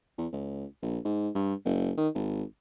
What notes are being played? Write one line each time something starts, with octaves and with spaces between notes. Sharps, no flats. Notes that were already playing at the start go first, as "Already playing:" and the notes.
E2
C#2
A#1
G#2
G2
F#1
D#3
G#1